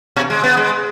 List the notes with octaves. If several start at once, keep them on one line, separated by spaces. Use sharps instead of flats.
B2
G#3
B3
G#3